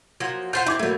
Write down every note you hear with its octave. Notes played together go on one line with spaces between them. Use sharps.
F3 F#3 A#3
F4 C5 F#5 G6 B6
C4 E4 D6 G#6
D3 E3 F#3 A3 A#3